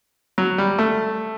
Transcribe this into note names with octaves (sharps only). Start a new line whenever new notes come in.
F#3
G3
A3